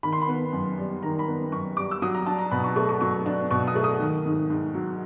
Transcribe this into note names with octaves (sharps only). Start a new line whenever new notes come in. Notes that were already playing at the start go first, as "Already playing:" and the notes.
D#3 B5
C6
B5
B3
F#2
G3
D#3 A#5
B5
B3
F#2 C#6
G3 D6
E6
F#3 D#6
A#5
D4 A5
A#5
B2 B5
C#6
A3 C#6
C#6
F#3 C#6
D4
B2 C#6
D#6
A3
D#6
D#3
G#2
G#2
F#3